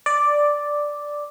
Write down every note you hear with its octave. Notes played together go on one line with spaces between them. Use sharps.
D5